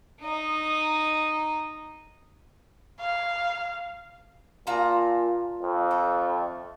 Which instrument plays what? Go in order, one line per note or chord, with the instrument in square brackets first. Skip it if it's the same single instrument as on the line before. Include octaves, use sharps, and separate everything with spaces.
[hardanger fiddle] D#4 D#5
[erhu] F5
[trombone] A#2 [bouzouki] F4 A5 A#5
[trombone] F2
[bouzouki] A3